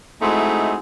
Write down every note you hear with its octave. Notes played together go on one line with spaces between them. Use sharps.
G#3 A3 C4 D#4 E4 F#4